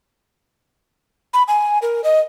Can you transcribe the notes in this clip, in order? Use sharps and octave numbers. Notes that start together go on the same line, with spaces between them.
B5
G#5
A#4
D#5